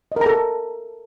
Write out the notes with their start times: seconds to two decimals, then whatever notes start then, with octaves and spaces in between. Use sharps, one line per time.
0.12 D#5
0.16 A#4
0.21 A#5
0.26 A4